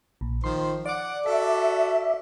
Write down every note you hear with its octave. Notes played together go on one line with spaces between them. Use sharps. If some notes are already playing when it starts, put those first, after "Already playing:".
A#1
D#3 F3 C5 C6
D5 F#5 D6
F#4 A4 E5